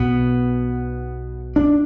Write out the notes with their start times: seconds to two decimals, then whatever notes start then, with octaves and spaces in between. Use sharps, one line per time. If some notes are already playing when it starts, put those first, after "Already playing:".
Already playing: B1 B2 B3
1.56 D4